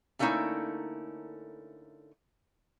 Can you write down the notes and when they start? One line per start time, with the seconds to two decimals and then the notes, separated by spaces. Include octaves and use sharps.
0.19 D3 A3 A#3 C#4 D#4 E4